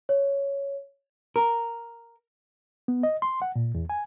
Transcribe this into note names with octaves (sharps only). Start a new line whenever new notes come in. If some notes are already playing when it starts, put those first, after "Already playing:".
C#5
A#4
B3
D#5
C6
F#5
A#2
E2
G#5